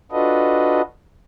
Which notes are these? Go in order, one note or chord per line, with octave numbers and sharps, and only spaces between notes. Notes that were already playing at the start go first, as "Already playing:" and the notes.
D4 F4 F#4 A4 B4 D#5